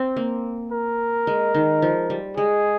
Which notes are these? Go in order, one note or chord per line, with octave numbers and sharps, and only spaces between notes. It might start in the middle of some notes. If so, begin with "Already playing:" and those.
Already playing: C4
A#3
A#4
G#3
D#3
F3
G3
G#3 G#4